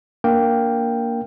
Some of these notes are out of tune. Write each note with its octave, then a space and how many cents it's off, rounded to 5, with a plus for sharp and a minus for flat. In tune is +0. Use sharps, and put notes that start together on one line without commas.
A#3 +0 D4 -10 G5 +0